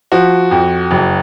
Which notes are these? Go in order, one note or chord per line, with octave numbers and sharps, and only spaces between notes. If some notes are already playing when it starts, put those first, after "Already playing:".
F3 F#4
F2
F#1